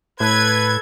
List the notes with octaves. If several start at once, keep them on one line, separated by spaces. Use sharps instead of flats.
A2 A4 B4 G#6